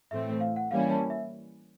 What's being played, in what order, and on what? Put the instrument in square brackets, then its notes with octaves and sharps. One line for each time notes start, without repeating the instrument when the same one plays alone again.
[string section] A2 E3 A3 C4 [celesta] E5
[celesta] F5
F#5
[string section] E3 G3 A#3 C#4 E4 [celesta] F5
[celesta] A5
E5